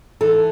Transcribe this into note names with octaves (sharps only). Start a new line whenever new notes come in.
E3 A4